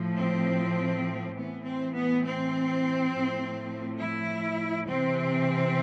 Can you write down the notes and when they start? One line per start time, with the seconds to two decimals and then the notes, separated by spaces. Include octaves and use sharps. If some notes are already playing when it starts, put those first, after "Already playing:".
Already playing: A2 F3
0.17 C4
1.35 A2 E3 B3
1.64 C4
1.94 B3
2.24 C4
3.11 A2 F3
4.00 E4
4.88 C3 E3 C4